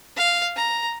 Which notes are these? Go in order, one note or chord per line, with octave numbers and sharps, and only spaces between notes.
F5
A#5